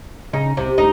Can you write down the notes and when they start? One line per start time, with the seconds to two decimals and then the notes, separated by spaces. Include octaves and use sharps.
0.33 C#3 D#4
0.57 C2 C3
0.78 D2 D#4